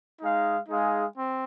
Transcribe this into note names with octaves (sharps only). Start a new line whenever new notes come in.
G#3 D#4 G#4 F5
G#3 D#4 G#4 F5
C4